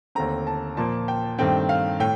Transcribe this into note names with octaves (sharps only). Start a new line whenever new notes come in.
D#2 D3 A3 C4 A#5
A5
A#2 F3 A#3 A5
G5
G2 D#3 A3 C4 G5
F5
A2 G5